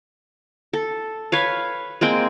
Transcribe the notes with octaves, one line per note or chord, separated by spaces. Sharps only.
A4
B4 C#5 F5
G#3 A#3 C4 G5